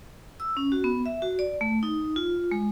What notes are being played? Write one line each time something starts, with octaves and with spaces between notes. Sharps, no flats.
E6
C#4
F#4
B3
E5
F#4
D5
A3
D#4
F4
G#3